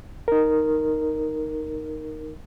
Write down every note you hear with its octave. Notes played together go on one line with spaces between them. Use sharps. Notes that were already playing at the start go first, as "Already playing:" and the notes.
D#4 A#4